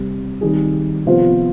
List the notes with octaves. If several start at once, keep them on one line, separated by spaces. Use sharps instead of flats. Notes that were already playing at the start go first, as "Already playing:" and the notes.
Already playing: C3 G3 C4
D#3 G3 C4 D#4 G#4
C3 F3 B3 F4 C5